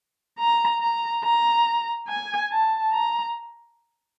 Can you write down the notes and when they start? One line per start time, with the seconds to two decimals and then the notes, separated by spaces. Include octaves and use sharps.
0.39 A#5
0.81 A#5
1.24 A#5
2.08 G#5
2.51 A5
2.92 A#5